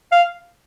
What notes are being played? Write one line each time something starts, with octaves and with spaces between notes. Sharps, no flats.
F5